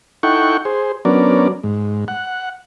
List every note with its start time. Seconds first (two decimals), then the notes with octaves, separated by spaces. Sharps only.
0.23 D#4 E4 A4 F#5 G5 C#6
0.65 G#4 C5
1.05 F#3 B3 C#4 D4 A#4 D5
1.63 G#2
2.08 F#5